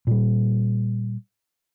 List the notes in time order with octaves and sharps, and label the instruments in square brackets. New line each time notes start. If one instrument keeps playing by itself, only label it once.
[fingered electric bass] A#2 G3